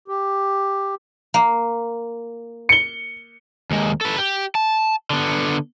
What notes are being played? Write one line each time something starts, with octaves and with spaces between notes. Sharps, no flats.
G4
A#3
C#7 G7
D#2 G#3
A4 B4
G4
A5
D3 B3